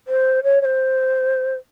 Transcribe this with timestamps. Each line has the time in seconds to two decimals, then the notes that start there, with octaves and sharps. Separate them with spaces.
0.08 C5
0.43 C#5
0.61 C#5
0.65 C5